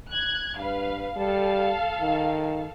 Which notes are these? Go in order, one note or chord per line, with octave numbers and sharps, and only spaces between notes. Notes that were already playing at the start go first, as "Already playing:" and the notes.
F#6 G#6
G2 B4 F5
G3 A4 F5
D#3